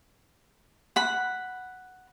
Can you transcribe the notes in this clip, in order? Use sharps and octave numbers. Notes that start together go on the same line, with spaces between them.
F#5 B5